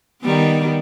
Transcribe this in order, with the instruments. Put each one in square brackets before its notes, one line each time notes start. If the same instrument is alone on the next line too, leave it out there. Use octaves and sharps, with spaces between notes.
[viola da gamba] D#3 G3 B3